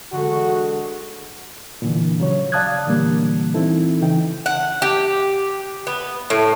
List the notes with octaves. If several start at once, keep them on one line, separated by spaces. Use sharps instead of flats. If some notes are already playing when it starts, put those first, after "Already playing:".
D3 F#3 G#3 F#4
A#2 D3 E3
C#3 F#3 C#5
D5 F5 A5 D#6 F#6 G#6
A#2 D3 E3 G3 A#3
E3 C4 D#4 E4 A4
C#3 E3 D#4 G5
F#5
G4
B3
A2